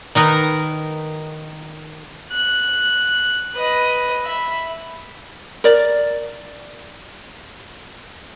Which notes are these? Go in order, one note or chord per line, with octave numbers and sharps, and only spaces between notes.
D#3 D#4 A#4 B4
F#6
B4 D#5
E5 B5
A#4 D5